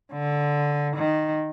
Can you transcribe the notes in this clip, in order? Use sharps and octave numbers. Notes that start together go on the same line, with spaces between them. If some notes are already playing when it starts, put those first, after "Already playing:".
D3
D#3